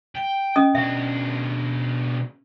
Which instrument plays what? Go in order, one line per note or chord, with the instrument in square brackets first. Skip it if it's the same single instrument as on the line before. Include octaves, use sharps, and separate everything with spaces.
[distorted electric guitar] G5
[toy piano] C#4 D#5 D#6
[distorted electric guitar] B2 D4 [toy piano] E5